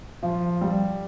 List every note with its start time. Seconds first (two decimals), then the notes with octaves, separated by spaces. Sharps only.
0.23 F3
0.61 G3